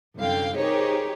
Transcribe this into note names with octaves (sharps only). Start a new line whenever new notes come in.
C2 F#2 D3 F5 G5
D#4 G4 G#4 A#4 C5 C#5